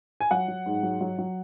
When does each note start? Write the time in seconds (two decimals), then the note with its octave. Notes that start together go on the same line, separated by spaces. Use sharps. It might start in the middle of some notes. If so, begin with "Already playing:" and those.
0.20 G#5
0.31 F#3 F#5
0.48 F#3
0.66 G#2
0.83 F#3
1.01 F#3
1.18 F#3